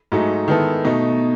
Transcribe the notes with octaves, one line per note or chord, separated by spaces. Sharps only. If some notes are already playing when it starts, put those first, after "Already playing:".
G#2 F#3 A3 D#4
D#3 G#3 B3 E4 A4
B2 A3 D#4